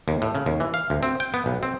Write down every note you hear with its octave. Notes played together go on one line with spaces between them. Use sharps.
D#2
A2
C#3
D#2
E3
F5
D2
C4
G5
B3
B1
C4